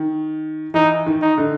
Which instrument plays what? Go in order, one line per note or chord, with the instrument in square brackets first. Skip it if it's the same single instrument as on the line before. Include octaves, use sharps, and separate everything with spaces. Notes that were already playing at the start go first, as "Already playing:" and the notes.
Already playing: [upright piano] D#3
[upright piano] E3 [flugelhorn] D#4
[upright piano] D#3
[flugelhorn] D#4
[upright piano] D3